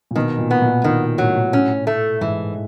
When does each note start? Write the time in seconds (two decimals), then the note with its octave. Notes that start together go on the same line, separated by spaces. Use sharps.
0.11 A#2
0.16 B2 D#3
0.38 A#2
0.51 B3
0.62 A#2
0.84 A#2 D#3
1.18 A2 F#3
1.53 C#4
1.87 A3
2.21 G#2 E3